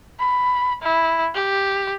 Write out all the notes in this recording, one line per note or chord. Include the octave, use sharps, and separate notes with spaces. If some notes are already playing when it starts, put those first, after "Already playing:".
B5
E4
G4